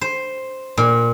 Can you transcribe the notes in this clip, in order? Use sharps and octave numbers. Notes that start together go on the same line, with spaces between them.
C5
A#2